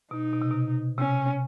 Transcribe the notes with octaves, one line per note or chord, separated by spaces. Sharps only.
B2 D#4
B2
C3
B2
C3 C#4